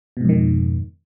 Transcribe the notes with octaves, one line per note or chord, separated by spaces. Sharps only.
F2 G#2 B2 D#3